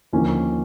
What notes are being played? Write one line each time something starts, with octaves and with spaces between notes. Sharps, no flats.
D#2 D3 F3 A#3 C#4